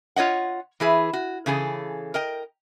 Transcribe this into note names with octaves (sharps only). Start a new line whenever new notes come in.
F4 C#5 D#5 F#5
E3 E4 G#4 B4
F#4
C#3 E3 G#4 A4
A#4 D#5 G5